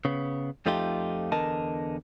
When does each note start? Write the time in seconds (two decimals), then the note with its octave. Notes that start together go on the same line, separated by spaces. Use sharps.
0.05 C#3 B3
0.66 F2 F3 A3 D#4 F4 G4
1.32 E2 D3 A#4 D#5 A5